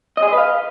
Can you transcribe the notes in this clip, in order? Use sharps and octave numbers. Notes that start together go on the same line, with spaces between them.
D#5
G#4
D#5
B4
F5